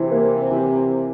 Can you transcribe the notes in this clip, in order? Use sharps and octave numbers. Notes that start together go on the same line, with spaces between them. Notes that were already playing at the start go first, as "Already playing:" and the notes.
Already playing: C3 E3
A#3
E3